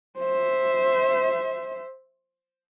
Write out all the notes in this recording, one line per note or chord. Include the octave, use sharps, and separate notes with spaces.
C5 E5